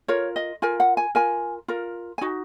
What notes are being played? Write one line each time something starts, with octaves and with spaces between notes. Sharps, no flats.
F4 A#4 C#5
D#5
F4 A#4 G#5
F#5
G#5
F4 A#4 G#5
F4 A#4
G#5
D#4 F#4